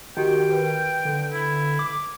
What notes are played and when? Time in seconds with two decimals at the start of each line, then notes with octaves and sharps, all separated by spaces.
0.17 D#3 F#4 G4 G5
0.52 B4
1.05 D3
1.32 E4
1.79 D6